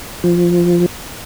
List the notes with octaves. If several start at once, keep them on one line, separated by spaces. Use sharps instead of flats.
F3